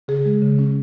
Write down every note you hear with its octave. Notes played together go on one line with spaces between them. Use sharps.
C#3 G#4
G#3
C#3
C#4